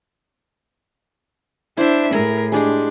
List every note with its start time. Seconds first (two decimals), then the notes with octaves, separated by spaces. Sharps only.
1.77 D4 E4 C5 E5 G5
2.12 A2 G#4 A#4 G#5 B5
2.52 G#3 D4 G4 G#4